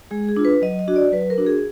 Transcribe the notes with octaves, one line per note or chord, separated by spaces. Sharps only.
G#3 G#4
G#4
D4 F4
B4
F#3 D#5
D#5
D4 F#4
D5
F#3 B4
A#4
D4 F#4
G#4